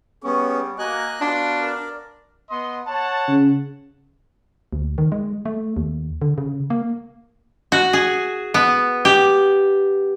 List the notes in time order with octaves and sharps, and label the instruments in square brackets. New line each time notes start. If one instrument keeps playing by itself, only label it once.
[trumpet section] G3 G#4 C#6 [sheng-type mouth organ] B3 C#4
[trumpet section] A#3 F#4 A#5 [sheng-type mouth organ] D#5 G#5 F#6
[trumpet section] B3 F4 F#4 [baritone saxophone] D4 [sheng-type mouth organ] C6
[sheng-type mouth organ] A#4 D5
[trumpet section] B3 D#5 C6
C#5 F#5 A5
[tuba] C#3
[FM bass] D2
D#3
G#3
A3
D#2
D3
C#3
A#3
[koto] F#4
G#4
B3
G4